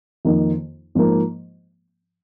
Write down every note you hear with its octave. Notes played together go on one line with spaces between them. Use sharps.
F2 D#3 A#3 D#4
G#2 F3 A#3